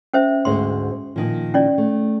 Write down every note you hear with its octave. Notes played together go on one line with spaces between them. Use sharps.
C#4 C5 E5
D2 G#2 C5 C6
A#2 D#3 F3
C#4 E4 D5
A3